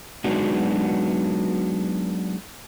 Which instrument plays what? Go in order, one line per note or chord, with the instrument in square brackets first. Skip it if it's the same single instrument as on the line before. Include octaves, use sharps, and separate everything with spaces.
[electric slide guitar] F#3 G#3 B3 D4 D#4 F#4